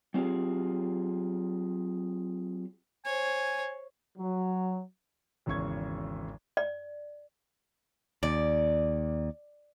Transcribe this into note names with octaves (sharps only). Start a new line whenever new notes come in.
F#3 C4 F4 G4 G#4
C5 C#5 G#5
F#3
G#1 E2 C#3 C#6 G#6
D5
D#2 D5